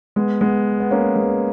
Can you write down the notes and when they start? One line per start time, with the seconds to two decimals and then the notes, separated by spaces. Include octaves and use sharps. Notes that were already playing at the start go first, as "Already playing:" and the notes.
0.16 G#3 B3
0.41 G#3 B3
0.80 B3
0.91 A#3 C#4
1.16 G#3 B3